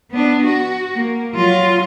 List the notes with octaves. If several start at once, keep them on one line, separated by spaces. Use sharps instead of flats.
B3 D4
F#4
A#3
F#3 F4